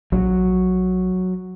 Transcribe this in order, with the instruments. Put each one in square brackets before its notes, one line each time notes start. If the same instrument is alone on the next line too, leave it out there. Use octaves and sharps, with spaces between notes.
[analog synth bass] A#1 [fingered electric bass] F#3